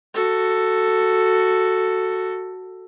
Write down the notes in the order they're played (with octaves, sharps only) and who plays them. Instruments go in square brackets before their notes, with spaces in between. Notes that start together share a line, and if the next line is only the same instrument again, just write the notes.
[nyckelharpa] F#4 A4